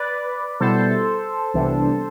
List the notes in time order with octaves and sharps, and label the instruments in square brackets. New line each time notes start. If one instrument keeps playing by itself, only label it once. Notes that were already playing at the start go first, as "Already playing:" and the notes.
Already playing: [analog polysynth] B4 D5
B2 G3 B3 E4 A4 C5
C2 C3 E3 B3 D4